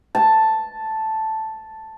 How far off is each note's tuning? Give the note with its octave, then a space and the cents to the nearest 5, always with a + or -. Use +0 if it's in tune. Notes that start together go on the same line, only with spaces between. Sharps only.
A5 +0